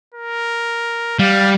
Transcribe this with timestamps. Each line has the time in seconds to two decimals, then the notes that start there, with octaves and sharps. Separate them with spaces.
0.14 A#4
1.19 G3 F5